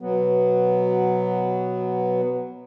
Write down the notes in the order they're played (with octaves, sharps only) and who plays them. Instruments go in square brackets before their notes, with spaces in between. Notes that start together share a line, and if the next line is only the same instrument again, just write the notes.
[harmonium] B2 F#3 B3